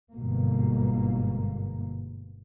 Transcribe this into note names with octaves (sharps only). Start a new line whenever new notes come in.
G1 G#2 B2 A#3